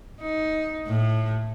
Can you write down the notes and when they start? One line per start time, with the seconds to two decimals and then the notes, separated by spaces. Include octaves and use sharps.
0.21 D#4
0.87 A2